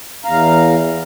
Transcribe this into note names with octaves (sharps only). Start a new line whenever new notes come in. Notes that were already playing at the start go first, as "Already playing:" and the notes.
E2 F5 A#5